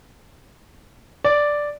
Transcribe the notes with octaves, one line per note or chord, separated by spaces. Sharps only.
D5